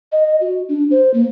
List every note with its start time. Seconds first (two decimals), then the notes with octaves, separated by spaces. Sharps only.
0.12 D#5
0.41 F#4
0.69 D4
0.91 C5
1.14 A#3